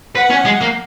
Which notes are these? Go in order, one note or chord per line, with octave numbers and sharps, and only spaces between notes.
B4 F#5
C#4
G#3
A#3